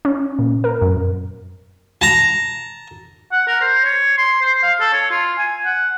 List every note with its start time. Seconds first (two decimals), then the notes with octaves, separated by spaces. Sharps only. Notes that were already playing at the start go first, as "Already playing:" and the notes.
0.05 C#4
0.39 A#2
0.64 A#4
0.82 F#2
2.01 A5 A#5
3.32 F#5
3.47 A#4
3.61 C5
3.85 C#5
4.17 C6
4.42 C5
4.63 F5
4.80 A4
4.93 C#5
5.11 F4
5.38 G#5
5.65 F#5